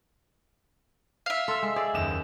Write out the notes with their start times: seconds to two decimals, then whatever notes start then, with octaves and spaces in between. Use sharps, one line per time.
1.26 E5 F5
1.48 A4 C6 E6
1.62 G#3
1.76 G#4 D5
1.93 F#1 D#2 E7